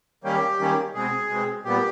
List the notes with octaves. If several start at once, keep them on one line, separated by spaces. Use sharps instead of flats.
D#3 G3 A#3 C#4 G4
D#3 G3 A#3 C#4
B2 G#3 C4 G#4
B2 G#3 C4
A#2 G3 B3 G4